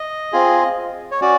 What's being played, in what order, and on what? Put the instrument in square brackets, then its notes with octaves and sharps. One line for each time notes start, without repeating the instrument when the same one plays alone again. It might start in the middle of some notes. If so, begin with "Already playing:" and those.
Already playing: [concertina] D#5
C4 F4 G#4
C#5
C#4 F#4 D5